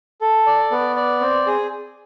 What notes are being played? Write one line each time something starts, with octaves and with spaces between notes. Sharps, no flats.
A4
D5
B3
D5
C4
G#4